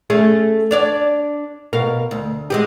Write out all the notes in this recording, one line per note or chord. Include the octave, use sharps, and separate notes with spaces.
A3 C#4 G#4
D4 C#5 D5
B2 A#4 F5
D2
G#3 C4 G4